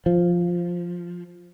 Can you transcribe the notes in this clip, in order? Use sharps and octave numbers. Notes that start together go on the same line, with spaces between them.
F3